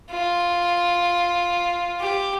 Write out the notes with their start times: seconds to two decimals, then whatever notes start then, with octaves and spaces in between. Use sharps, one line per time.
0.11 F4
2.01 G4